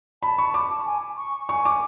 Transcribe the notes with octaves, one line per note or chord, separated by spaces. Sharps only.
A5 B5
C#6
D6
G#5
C#6
G#5 C#6
D6